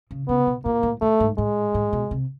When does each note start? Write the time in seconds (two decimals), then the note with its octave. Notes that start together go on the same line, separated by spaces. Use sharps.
0.11 C#3
0.28 C#3 B3
0.47 B2
0.65 A#2 A#3
0.83 A2
1.01 A2 A3
1.20 G#2
1.38 A2 G#3
1.74 A2
1.93 B2
2.11 C3